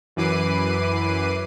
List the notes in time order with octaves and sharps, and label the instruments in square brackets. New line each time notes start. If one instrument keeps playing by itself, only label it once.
[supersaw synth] F#2 E3 B4 D6 C7 D#7